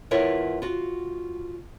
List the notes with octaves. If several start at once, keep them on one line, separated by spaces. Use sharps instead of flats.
E2 E4 F4 A#4 C#5
F4 F#4